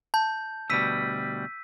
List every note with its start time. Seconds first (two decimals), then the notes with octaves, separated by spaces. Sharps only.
0.14 A5 G6
0.70 D2 B2 G3 E6 B6 D#7